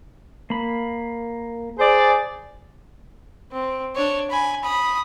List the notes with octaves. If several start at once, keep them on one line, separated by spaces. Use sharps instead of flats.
A#3 B5
G#4 C5 D5
C4
D4 C#5
G#5 B5
B5 D#6